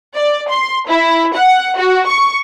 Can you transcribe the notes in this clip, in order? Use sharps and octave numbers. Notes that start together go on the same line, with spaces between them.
D5
C6
E4
F#5
F#4
C#6